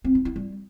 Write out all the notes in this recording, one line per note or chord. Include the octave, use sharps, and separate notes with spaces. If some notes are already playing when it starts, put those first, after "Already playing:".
C4
D#4
E4
G3